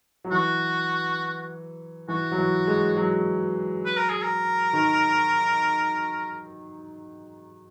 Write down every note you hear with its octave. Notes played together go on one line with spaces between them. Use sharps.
F#3
E3 F#4
E3 F#4
F#3
E3
G#3
F#3
B4
A#4
G#4
A#4
D#3